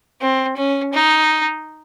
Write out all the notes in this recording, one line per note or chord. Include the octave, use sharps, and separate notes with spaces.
C4
C#4
D#4